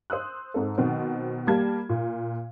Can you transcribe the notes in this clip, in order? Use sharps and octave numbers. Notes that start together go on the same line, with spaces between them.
C5 D#6 E6 F#6
G#2 C4 A4
B2 D#3 F#3 C4
G3 A#3 G4 A5 G#6
A#2